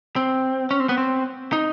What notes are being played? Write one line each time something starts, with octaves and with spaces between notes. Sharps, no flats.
C4
C#4
C4
B3
C4
D#4